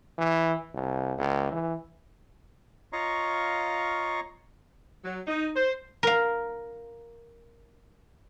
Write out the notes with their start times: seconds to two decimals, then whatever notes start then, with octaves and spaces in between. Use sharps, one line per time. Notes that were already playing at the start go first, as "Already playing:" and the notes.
0.18 E3
0.75 C2
1.19 C#2
1.52 E3
2.93 F4 C#5 D#5 F5 A#5 C#6
5.04 F#3
5.27 D#4
5.56 C5
6.03 A#4 F5